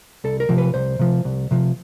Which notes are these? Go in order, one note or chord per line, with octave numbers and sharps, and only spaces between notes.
C2 A4
A#4
C3 F3
B4
C2 C5
C3 F3
C2
C3 F3